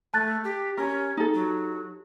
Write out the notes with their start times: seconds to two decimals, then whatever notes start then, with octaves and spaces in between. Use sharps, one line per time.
0.14 A3 A5 F#6 A6
0.44 G4
0.77 C#4 G4 A#4
1.17 D#4 A4
1.34 F#3